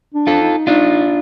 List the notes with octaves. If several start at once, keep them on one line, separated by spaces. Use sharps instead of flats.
D4
F4 A4
D#4
D4 D#4 F4